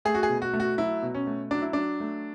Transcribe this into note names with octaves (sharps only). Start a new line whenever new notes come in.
A3 G#4
F#4
G#4
B2
F#4
A3
F#4
F#3 E4
B2
C#4
A3
F#3 D4
E4
F#3 D4
A3